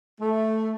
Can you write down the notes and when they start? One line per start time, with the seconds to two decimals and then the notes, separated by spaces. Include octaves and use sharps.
0.21 A3